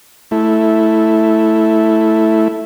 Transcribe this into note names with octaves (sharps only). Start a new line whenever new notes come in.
A3 E4